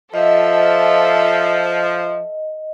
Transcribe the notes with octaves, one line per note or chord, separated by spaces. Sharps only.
F3 A4 D#5 E5